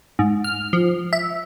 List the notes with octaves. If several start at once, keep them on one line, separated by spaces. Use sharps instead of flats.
G#2
F6
F3
E5